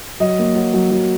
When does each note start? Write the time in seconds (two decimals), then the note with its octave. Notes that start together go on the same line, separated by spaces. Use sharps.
0.20 F#3 D#5
0.39 A#3
0.55 F#3
0.74 F#3
0.91 F#3